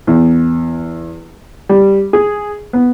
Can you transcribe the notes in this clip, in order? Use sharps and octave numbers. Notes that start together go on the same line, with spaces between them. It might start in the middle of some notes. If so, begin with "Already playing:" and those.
E2
G3
G#4
B3